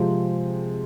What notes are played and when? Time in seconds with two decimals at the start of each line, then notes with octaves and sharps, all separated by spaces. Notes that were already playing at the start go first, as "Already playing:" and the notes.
Already playing: C3 F3 G#3 C4